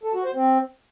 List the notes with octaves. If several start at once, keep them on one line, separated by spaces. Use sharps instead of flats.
A4
F#4
C5
C4